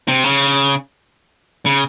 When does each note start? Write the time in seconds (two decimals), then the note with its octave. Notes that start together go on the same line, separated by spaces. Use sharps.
0.08 C3
0.24 C#3
1.66 C#3